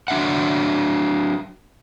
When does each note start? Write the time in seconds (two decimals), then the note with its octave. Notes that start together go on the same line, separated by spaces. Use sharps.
0.08 F#3 D4 E5 F#5